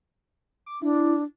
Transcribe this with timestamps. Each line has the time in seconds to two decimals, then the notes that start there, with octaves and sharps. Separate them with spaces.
0.66 D6
0.82 D4 E4